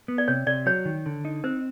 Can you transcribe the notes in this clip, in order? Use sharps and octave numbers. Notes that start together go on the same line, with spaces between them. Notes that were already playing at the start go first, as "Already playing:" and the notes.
B3
D5
C3 C#5
C3 D5
F#3 C#5
D#3
D3
D#4
C4 C5